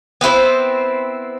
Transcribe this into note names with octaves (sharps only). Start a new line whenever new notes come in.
B3 C4 E4 C5